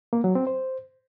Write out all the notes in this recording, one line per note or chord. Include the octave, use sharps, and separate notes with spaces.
A#3
F#3
C4
C5